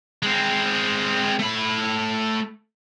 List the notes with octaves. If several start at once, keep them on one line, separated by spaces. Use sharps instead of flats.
G#3 C4
A3 B5